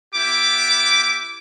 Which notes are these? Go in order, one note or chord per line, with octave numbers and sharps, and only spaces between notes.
B3 E4 G4 D6